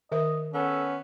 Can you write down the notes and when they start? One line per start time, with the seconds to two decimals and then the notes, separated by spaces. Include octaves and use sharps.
0.12 D#3 A#4 D#5 E5
0.54 B3 C#4 A4